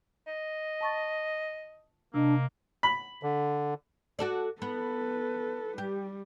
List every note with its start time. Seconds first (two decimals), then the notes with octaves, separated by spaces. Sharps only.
0.28 D#5
0.81 A5 C#6 A6
2.14 C3 A#3 D4 D#5
2.83 B5
3.23 D3
4.19 F#4 A4 D5
4.62 B3 A4 B4
5.78 G3 G4